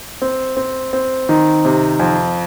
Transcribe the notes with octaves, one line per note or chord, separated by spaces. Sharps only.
C4
C4
C4
D#3
C3
F2